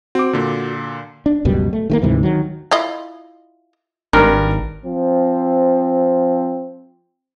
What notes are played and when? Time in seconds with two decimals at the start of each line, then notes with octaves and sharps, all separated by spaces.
0.15 C4 F#4 D6
0.33 A#2 D3
1.26 D4
1.45 C#2 F#2 B2 G3
1.73 A3
1.90 D#3 A3 A#3
2.02 D2 G#2 C3 E3
2.23 D#3 F#3
2.71 E4 F4 D#5
4.13 G#1 G2 D#4 A#4
4.86 F3 C4